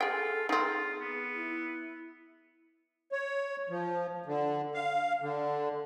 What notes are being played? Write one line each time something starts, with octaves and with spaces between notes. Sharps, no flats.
F4 G#4 A4 G5
C4 D#4 F4 G#4
B3
E4
C#5
F3
D3
F5
D3